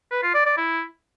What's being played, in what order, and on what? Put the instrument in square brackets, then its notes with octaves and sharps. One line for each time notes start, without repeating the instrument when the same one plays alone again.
[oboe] B4
F4
D5
D5
E4